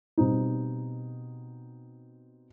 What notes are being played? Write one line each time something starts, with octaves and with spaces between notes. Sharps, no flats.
B2 G3 C4 D#4